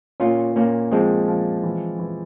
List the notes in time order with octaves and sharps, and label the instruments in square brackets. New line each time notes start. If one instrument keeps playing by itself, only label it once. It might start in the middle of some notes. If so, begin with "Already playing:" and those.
[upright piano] A#2 [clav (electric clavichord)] C#4 F4
[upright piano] A#2 [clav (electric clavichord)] A#3 C#4
[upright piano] F3 [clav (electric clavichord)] G#3 C4
[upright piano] F3
E3
E3